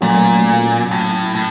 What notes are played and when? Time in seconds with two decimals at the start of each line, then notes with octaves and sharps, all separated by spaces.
0.01 A#2 F#3 A3 C#4 F#4
0.91 A2
1.35 A2